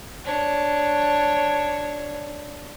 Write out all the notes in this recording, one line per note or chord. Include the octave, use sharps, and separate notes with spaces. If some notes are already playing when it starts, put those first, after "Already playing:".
D4 C#5